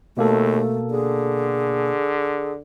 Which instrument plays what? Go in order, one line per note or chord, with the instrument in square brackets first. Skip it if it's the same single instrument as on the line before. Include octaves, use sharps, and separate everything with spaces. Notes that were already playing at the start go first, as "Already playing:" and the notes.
[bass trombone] D#2 [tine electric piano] B2 A#3 A4 [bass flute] A3
[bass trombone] D3 [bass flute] G#4